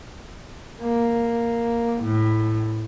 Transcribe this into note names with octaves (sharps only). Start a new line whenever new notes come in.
A#3
A2